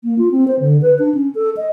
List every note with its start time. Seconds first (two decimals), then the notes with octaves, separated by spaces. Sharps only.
0.04 A#3
0.18 F4
0.32 C4
0.48 C5
0.60 D3
0.82 B4
0.99 D4
1.14 C#4
1.35 A4
1.57 D#5